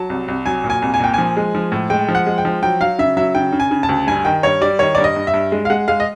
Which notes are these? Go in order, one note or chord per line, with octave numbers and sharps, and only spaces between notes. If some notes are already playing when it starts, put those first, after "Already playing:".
Already playing: F#3 A5
C2
C2
F#3 G#5
A#2
G#5
C2
G#5
A#2 G5
F3 G#5
G#3
F3
A2
G#3 G5
F3
F#5
G#3
G5
F3
F#3 G5
F#3 F5
C#3 E5
F#3 E5
C#3 G5
C#3
G#5
C#3
A5
D2
G2 G#5
D#3 G5
G2 C#5
G3 D5
D#3 C#5
G2 D5
D#5
G2
E5
G2
G#3
F5
G#3 F#5
G#3 F5
D#5